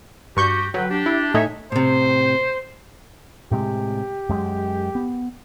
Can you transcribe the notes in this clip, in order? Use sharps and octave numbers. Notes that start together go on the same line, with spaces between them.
G2 F#4 G4 C#6 G6
D3 F#3 B4 G5
D4 G4
E4
A2 A3 D#4 C#5 E5 G#5
A2 C3 C5
A2 C3 G#3 G4
F#2 G#3
B3